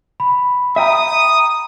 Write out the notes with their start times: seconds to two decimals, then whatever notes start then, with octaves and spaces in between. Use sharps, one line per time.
0.20 B5
0.76 E5 G5 A#5 D#6